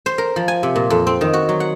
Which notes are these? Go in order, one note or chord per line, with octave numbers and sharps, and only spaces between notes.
C5
A#4
F3
G#5
C3
A#2
F2
C4
D#3
F#4
F#3
F#5